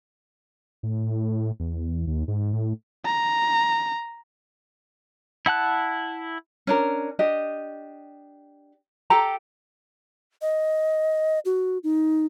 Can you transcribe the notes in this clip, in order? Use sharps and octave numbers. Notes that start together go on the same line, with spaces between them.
A2
E2
D#2
G#2
A2
A#5
E4 F#5 A5 F#6
C#4 D4 A#4
D4 G4 D#5
G4 A4 G5 A#5
D#5
F#4
D#4